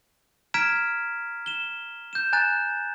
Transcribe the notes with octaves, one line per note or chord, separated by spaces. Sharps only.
A#5 F6 G#6 B6 D7 E7
E7 G7
G6 E7
G#5 A#5 F#6 A6 E7